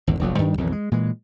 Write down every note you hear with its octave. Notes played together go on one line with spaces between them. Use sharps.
G#1 E2 D3
F1 A#1 F2 F#3
G2 D#3 G3 D4
B1 F2 D#3 E3
G#3
A#2 E3 G#3